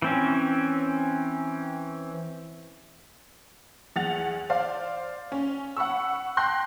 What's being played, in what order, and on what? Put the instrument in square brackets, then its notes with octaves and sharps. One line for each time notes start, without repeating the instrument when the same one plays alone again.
[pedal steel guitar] E3 C4 C#4
[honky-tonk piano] E2 F#5 A6 F7
C5 D5 F5
C#4
F#5 B5 C#6 E6
G5 A5 C6 F#6 G6 A#6